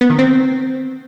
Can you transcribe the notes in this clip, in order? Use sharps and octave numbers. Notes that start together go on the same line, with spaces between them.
B3
D#3
C4